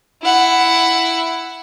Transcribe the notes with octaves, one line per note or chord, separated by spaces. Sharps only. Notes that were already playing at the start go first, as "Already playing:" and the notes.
E4 F#5